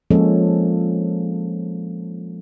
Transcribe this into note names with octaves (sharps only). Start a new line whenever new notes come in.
F3 G#3 A#3 C#4 A4 C#5